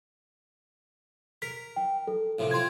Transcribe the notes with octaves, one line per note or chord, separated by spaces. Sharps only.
A#4 B6
G5
A4
A#1 A2 C3
C4 F4 C6 G#6